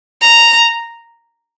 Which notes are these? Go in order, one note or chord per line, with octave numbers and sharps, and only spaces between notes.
A#5